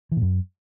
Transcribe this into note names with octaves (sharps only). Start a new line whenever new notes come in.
E3
A#2
F#2